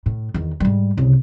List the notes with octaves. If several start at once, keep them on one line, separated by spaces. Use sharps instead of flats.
A2
E2 D#3
G#2 G3
C2 C#3